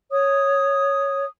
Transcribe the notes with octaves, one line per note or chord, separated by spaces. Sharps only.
C#5 D#6